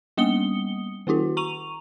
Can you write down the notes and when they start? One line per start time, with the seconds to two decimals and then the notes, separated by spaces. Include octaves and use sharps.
0.17 G3 A#3 B3 D#6 C#7 G7
1.07 D#3 A#3 E4 F#4
1.37 A#5 C#6 D#7 F7